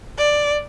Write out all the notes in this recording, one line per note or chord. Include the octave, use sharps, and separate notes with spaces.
D5